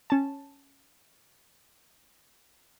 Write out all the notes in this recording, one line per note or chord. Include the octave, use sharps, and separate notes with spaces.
C#4 A5